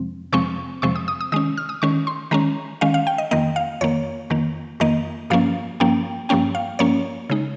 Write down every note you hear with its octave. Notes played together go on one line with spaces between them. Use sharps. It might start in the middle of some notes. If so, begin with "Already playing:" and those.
Already playing: F2 C3 F3 G#3 C4
F2 C3 F3 G#3 C4 C#6
F2 C3 F3 G#3 C4 C#6
D#6
D#6
D#6
D#3 G#3 C#4 D#6
F6
D#6
D#3 G#3 C#4 C#6
C6
D#3 G#3 C#4 A#5
D#3 G#3 C#4 F5
F5
G5
D#5
F2 D#3 A#3 D#5
F5
F2 D#3 A#3 C#5
F2 D#3 A#3
F2 D#3 A#3 D#5
G2 F3 A#3 C#4 F5
G2 F3 A#3 C#4 G5
G2 F3 A#3 C#4 G5
F5
G2 F3 A#3 C#4 C#5
C#3 G#3 D#4